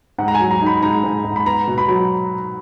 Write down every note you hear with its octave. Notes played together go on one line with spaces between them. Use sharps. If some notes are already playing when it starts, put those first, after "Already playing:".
G#2 F#5
A#5
G#5
F#3
A#5
D#4 B5
G#2 A#5
G#2
G#2
B5
B3 A#5
B2
B5
F#3